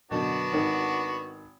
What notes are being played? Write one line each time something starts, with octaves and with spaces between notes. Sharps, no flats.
F#2 B2 D3 B3 D4 F#4
G#1 D#3